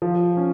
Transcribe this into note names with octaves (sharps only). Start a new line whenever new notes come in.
F3
C#4